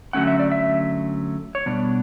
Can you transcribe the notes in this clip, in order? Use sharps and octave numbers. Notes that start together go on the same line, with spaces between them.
D3 F#3 A3 C#4 F#5
E5
D5
E5
C#5
B2 G3 B3 D4 D5